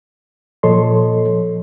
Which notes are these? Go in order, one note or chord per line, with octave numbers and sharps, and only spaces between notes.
A#2 F3 A4 C#5 D#5 C6